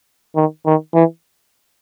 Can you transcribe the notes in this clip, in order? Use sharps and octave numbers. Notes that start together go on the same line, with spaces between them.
D#3
D#3
E3